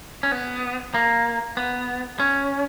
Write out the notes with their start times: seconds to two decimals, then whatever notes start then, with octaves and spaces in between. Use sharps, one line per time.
0.23 C#4
0.32 B3
0.94 A#3
1.57 B3
2.20 C#4